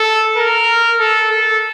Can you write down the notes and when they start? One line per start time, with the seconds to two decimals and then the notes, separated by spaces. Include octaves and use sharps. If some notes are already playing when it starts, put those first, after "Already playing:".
Already playing: A4
0.36 A#4
1.00 A4
1.31 A4